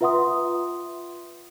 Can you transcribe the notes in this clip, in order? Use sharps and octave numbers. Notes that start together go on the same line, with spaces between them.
F4 B4 E5 F#5 C6 D#6